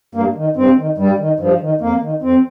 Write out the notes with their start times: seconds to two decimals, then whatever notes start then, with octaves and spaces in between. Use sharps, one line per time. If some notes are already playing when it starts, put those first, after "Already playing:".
0.15 G2 A#3
0.36 D#3
0.56 G2 C4
0.77 D#3
0.98 G2 G3
1.19 D#3
1.40 G2 F3
1.61 D#3
1.81 F2 A#3
2.01 D#3
2.22 F2 C4